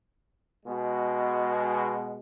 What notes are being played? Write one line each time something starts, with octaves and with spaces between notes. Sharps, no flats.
B2 G#3